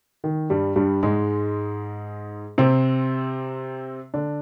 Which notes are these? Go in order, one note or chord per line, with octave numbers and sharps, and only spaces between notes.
D#3
G2 G3
G2 G3
G#2 G#3
C3 C4
D3 D4